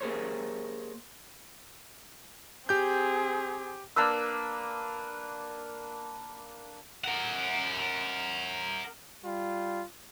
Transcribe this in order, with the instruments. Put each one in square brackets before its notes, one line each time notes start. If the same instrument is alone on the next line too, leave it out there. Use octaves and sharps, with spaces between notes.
[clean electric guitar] A#3 G4 G#4 A#4 C5 C#5
[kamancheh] C4 G#4 [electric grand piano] G4 G6
[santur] A#3 D4 B4 E6
[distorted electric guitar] A#4 F#5
[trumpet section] G3 F4